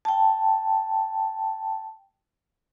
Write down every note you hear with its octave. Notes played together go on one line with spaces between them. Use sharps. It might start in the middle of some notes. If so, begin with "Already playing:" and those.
G5 A5